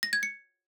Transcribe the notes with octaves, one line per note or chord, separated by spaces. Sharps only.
A#6
G#6
C#7